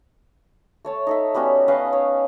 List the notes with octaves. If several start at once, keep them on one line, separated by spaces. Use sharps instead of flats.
A3 C#5 A5
D#4 A4 E5
G3 B3 C#4 F#4
C#4 B4 D#5 F5
C#5